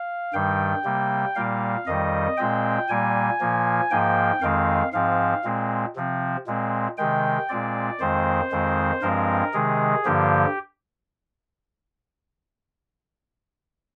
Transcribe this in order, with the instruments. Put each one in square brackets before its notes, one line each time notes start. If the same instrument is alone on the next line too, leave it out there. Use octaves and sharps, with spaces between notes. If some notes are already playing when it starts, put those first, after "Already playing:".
Already playing: [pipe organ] F5
G2 D#3 G3 G5
C3 G3 A#3
A#2 G3 A#3 F5
F2 D#3 G3 D#5
A#2 G#3 C4 G5
A#2 G3 A#3 G#5
A#2 F3 A#3
G#2 F3 A#3 G5
F2 D#3 G#3 C4 F5
G#2 F3 C4 F5
A#2 G#3 C4
C3 F3 C4
A#2 G#3 C4
C3 D#3 G#3 G5
A#2 G#3 C4 D5
F2 D#3 G#3 C4 C5
F2 D#3 G#3 C4
G2 F3 G#3 C4 A#4
C3 D#3 G#3 G#4
G2 D3 F3 A#3 G4